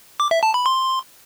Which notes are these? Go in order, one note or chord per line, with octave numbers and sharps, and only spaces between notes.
D6
E5
A5
B5
C6